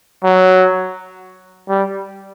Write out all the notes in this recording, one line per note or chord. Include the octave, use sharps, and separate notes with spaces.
F#3
G3